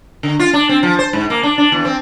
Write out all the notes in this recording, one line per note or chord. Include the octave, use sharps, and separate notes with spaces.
D3
F4
D4
C4
F3
C5
G#2
A#3
D4
D4
E2
C4